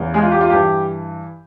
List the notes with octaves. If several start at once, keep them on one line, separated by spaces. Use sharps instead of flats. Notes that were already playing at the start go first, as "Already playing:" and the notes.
Already playing: E2 C#3 E3
G#3 G#4
F4
G4
F4
G2 E3 G4